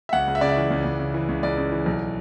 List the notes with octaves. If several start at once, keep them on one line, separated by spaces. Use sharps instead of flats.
E5
C#2 F#5
C#2
E5
C#3 D5
E5
E3
C#2
C#2
C#3
E3
C#2
C#2 D5
C#3
E3
B1